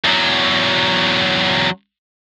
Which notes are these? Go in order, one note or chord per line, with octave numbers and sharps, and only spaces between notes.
E2 F#3